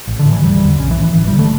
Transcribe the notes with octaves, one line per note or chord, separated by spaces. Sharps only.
A1
D3
A2
E3
E1 G3
E2 D3
B1 C#4
E3
A2
E3
G1 E3
G3
D3
A3